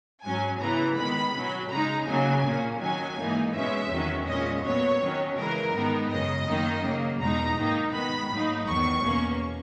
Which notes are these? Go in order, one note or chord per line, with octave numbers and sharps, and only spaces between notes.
G#2 F#3 C#4 G#5
C#3 E3 B3 A#5
D#3 G#3 B3 B5
B2 F#3 C#4
C#3 G#3 D#4 A#5
C#3 F#3 A#3 G#5
A#2 A#3 C#4
D#3 F#3 C#4 G#5
G#2 E3 A#3 D#4
B2 G#3 C#4 E5
E2 D#3 F#3 C#4
A#2 G#3 C#4 D#5
A#2 F#3 B3 C#5
D#3 F#3 C#4
C#3 E3 G#3 A#4
G#2 D#3 G#3 B3 D#4
F#2 C#3 G#3 D#5
F#2 D#3 A#3 D#4
C#3 F#3 A#3
E2 B2 G#3 D#4 A#5
G#2 D#3 A#3 D#4
D#3 G#3 B3 B5
G#2 F#3 A#3 D#4
E2 D#3 F#3 C#6
E2 B2 A#3 C#4